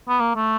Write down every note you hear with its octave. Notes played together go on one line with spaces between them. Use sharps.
B3
A#3
A3